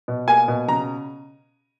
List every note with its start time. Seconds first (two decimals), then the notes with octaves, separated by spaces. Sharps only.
0.08 B2
0.28 A#3 G#5
0.48 B2
0.68 C#3 A#5